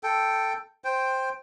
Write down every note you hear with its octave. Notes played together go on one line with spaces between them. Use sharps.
A4 G5
C5 G5